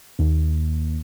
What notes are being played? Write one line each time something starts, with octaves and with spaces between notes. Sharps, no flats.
D#2